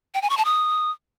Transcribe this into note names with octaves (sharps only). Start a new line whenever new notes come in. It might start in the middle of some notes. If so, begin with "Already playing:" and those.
G5
G#5
C#6
A5
D#6